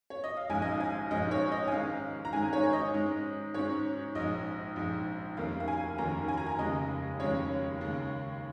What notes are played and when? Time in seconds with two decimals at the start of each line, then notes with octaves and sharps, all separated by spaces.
0.10 C#5
0.24 D#5
0.37 F5
0.50 A#1 G#2 G#3 C#4 G#5
0.62 D#5
0.71 F5
0.80 G#5
1.11 A#1 G#2 G#3 C#4 D#5
1.31 C#5
1.52 D#5
1.68 G#5
1.71 G#2 D#3 G#3 C#4 F5
2.25 A#5
2.33 G#2 D#3 G#3 C#4 G#5
2.53 C#5
2.64 C#5
2.73 D#5
2.93 G#2 G#3 C#4
3.54 G#2 G#3 C#4 C#5
4.15 A#1 G#2 G#3 D#5
4.76 A#1 G#2 G#3
5.37 F1 D#2 D#3 A#3 C#4 F5
5.60 F5
5.68 G#5
5.98 F1 D#2 D#3 A#3 C#4 A#5
6.28 G#5
6.37 A#5
6.46 G#5
6.59 F1 D#2 C#3 G#3 C#4 D#5
7.20 F1 D#2 C#3 G#3 C#4 C#5
7.81 D#2 C#3 G#3